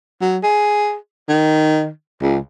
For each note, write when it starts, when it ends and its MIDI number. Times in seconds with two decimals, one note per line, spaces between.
0.21 0.38 54
0.43 0.96 68
1.29 1.89 51
2.22 2.38 37